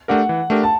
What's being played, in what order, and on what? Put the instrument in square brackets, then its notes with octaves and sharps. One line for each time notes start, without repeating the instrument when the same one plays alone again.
[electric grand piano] A3 D4 G4 A#4 [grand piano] F#5
[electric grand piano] E3
A3 D4 G4 A#4
[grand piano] A5